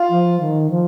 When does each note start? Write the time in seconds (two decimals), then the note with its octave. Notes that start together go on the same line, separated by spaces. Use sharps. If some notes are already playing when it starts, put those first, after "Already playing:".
Already playing: F4
0.10 F3
0.40 D#3
0.70 F3